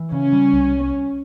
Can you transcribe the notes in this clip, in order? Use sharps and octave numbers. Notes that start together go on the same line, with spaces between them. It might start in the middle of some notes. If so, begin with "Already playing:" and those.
Already playing: E3
C#3 C#4
G3
C2